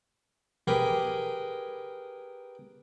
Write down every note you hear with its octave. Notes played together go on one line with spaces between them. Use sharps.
G4 G#4 A#4 B4 G5 G#5